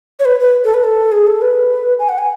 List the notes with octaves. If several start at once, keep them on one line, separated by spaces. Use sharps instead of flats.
C#5
B4
B4
A4
B4
A4
G#4
A4
B4
G#5
F#5
G#5